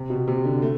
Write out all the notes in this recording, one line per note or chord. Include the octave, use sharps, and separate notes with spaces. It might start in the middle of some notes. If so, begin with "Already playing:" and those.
Already playing: C3
B2
C3
D3
A3